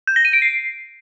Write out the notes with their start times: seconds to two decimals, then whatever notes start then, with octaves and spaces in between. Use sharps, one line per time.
0.07 G6
0.16 A#6
0.25 D#7
0.33 D7
0.42 C7